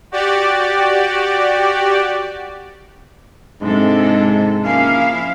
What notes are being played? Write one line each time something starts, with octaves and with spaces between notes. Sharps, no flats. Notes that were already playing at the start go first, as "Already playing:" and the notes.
F#4 G4 D5
G#2 C3 G#3 D4 A4
F3 A#3 C#4 E4 F5